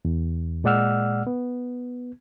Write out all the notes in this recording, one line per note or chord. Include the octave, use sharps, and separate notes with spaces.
E2
A#2 G#3 D5 F#5 E6 F6
B3